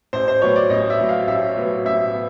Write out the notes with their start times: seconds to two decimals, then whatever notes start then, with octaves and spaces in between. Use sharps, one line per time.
0.13 A1 C5
0.28 C5
0.42 A2 F#3 B3 C#5
0.56 D5
0.70 A1 D#5
0.90 E5
0.99 A2 F#3 B3
1.09 F5
1.27 A1 E5
1.57 A2 F#3 B3
1.85 A1 E5
2.14 B3